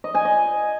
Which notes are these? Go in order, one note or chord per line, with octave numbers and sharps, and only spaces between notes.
D#5
G#5
D#5